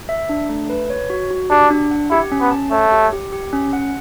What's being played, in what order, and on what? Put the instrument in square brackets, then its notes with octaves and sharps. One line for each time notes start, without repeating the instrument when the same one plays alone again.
[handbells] E5
D4
A3
B4
C#5
F#4
F#4
[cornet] D4 [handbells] G4
[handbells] D4
F#5
[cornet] E4 [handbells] G4
[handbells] C#4
[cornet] B3
[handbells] A5
[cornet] A3 [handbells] C#5
[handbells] G4
G4
G4
C#4
F#5